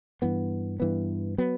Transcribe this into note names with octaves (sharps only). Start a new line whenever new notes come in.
G2 E3 B3
G2 E3 B3
F#3 B3